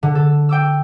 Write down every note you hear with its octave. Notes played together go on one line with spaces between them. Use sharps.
D3
A4
G5 D6 E6